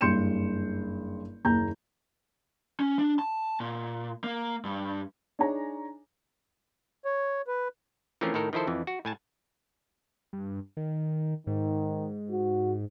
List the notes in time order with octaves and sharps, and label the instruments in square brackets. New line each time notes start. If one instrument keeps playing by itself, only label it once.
[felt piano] F#1 G2 C6 G6 C#7 E7
F#1 D#2 A#5 G6
[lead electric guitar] C#4
D4
A5
A#2
A#3
G2
[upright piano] D4 D#4 G#4 C#5 G#5 A#5
[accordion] C#5
B4
[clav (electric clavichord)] E3 F3 A3 C4 C#4 A#4
A2 D#3 A4 A#4
D#3 F3 E4 A4 C5
F2 E3
F#4
A2 G#5 A5
[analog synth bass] G2
D#3
[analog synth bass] G#2 [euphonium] D#3
[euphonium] F#4